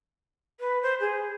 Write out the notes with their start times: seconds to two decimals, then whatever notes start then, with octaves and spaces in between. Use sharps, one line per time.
0.60 B4
0.82 C5
1.00 G#4